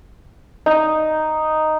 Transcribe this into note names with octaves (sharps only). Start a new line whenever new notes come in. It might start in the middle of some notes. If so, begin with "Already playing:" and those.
D#4